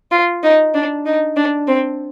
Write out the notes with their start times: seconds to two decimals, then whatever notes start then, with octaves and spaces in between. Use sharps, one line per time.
0.11 F4
0.43 D#4
0.74 D4
1.06 D#4
1.37 D4
1.68 C4